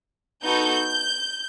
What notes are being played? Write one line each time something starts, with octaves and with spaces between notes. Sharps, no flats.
B3 D#4 F#4 A4 G6